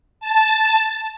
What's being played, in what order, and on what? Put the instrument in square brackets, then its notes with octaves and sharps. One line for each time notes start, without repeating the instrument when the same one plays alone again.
[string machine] A5